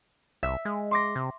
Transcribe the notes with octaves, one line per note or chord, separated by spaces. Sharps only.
C2 E5
G#3
C6 D6 A#6
C3